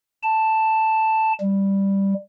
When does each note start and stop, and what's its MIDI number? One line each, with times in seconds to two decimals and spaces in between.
0.23 1.33 81
1.41 2.14 55